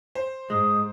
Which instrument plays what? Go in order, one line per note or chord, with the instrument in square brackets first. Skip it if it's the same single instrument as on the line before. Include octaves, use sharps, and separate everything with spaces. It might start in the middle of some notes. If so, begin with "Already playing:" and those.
[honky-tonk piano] C5
[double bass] G#2 [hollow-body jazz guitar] G#3 [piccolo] D#6